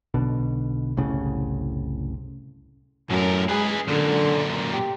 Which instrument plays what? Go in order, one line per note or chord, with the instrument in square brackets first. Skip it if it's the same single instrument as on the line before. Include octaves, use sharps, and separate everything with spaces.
[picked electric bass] B1 B2 D3
F#1 C2 A2 C#3
[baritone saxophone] F#2 [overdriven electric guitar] A2 A#4
[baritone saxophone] G#3 [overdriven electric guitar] G#4 B4
[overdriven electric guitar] F#2 A#2 [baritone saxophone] D3
[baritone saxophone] G4